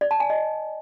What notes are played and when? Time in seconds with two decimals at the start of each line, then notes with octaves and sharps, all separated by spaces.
0.01 D5
0.11 A5
0.20 G#5
0.30 D#5